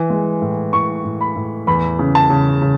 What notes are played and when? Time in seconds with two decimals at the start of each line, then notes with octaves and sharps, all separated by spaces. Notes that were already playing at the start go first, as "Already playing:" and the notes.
Already playing: E3
0.10 G#3
0.42 A2
0.73 A2 C#6
1.05 A2
1.21 B5
1.36 A2
1.67 E2 B5
1.99 C#3
2.15 A5
2.30 C#3
2.62 C#3